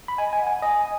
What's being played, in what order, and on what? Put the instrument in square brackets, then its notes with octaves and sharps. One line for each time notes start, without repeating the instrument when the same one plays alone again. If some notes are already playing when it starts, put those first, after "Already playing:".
[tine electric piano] B5
[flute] D#5 [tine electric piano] G#5
[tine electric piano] G#5
[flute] F#5
[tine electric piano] G#5
[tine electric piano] D#5 [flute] G#5